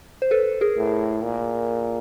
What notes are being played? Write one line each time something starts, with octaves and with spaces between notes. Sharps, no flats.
C5
A4 B4
G#4 A#4
A2
A#2